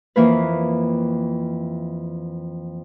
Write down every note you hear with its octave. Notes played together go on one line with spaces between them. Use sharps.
F2 E3 A#3 B4